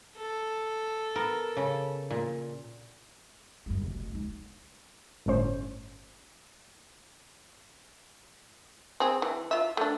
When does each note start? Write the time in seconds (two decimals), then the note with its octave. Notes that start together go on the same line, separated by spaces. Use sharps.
0.16 A4
1.15 B3 A#4
1.57 C#3
2.11 A#2
3.66 F#2 G3
3.81 F1 B1
4.12 G#3 D#4
5.26 G1 A2 C#4 C5
9.00 C4 G#4
9.22 E3
9.51 F4 E5
9.77 A3 D4